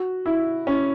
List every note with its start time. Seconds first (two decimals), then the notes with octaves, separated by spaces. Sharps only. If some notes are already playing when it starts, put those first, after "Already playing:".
Already playing: F#4
0.26 E4
0.67 C#4